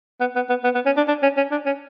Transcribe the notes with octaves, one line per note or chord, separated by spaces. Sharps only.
B3
B3
B3
B3
B3
C#4
D4
D4
C#4
C#4
D4
C#4